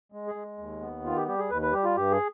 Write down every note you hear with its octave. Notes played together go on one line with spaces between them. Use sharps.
G#3
G#4
G#3
D#2
B3
D#3 F4
G4
G3 G4
G#4
D#2 B4
B4
G3 G4
F4
G2 G4
G#4